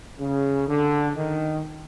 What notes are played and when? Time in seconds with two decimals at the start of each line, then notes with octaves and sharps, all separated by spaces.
0.20 C#3
0.68 D3
1.16 D#3